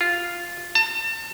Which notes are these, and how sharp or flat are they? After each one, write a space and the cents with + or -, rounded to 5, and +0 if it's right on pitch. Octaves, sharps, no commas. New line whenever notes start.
F4 -5
A5 +35